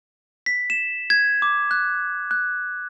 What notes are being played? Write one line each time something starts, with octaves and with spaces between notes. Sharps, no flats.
B6
E7
G#6
D6
F#6
F#6